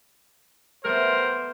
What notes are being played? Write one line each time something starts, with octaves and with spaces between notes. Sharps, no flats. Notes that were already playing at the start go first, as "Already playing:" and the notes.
G3 A3 B3 A#4 C5